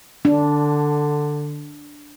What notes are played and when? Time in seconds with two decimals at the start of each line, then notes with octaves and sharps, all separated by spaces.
0.25 D3 D4